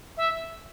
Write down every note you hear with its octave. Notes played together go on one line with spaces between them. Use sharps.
E5